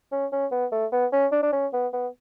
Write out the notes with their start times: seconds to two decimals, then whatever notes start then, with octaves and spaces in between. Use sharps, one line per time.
0.12 C#4
0.32 C#4
0.52 B3
0.72 A3
0.92 B3
1.13 C#4
1.32 D4
1.43 D4
1.53 C#4
1.74 B3
1.93 B3